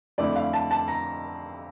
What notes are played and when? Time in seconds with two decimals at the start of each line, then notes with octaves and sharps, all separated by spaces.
0.18 F2 D3 A3 E4 D5
0.36 F5
0.53 A5
0.71 A5
0.88 A#5